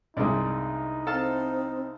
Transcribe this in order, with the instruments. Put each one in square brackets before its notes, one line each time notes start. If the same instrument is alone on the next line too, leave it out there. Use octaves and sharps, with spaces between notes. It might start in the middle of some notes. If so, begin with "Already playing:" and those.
[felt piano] C2 G#3 [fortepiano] G2 C3 D4 [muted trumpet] D#4
[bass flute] C4 [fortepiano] A4 F5 A5